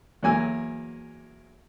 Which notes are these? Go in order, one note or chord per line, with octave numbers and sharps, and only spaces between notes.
E2 F#3 A#3 G#5 E6